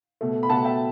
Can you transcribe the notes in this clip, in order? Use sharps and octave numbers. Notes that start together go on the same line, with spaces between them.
B2 A3
B5
B2 A3 F#5 A5
E5 G5